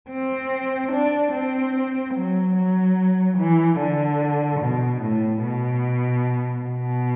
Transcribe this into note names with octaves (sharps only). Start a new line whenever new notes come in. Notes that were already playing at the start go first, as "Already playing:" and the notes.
C4
D4
C4
F#3
F#3
E3
D3
B2
A2
B2
B2